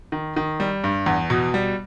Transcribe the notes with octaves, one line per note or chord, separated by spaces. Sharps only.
D#3
D#3
G3
G2
E2
B2
G3